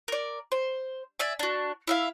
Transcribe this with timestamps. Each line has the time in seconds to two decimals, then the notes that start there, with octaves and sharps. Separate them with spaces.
0.08 A#4 D5
0.52 C5
1.19 D5 E5 G#5
1.39 D4 F#4
1.87 E4 E5 F5